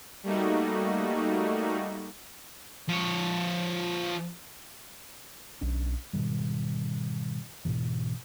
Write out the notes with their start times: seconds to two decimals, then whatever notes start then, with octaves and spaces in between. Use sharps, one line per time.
0.23 G3 A3 A#3 D#4 F#4
2.89 F3 C#5
5.61 B1 C#4 D4
6.13 G#2 B2 D#3 G3
7.65 G#2 B2 E3